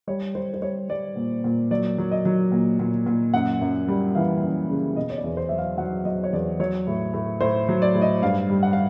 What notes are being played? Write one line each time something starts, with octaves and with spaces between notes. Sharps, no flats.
G3 C#5
G3 C5
C5
G3 C#5
G3 D5
A#2
A#2
F#3 D5
F#3
D#5
F#3
A#2
A#2
A#2
F#2 F#5
F#2
G3
E3 F5
F#2
C#3
B2 D#5
C#5
D5
E2
C5
F#3 E5
F5
F#3 F#5
F#3 D#5
C#5
E2 D5
F#3 C#5
A2
A2
A2 C5
F#3
D5
A2
D#5
G2 F5
G3
F#5
F5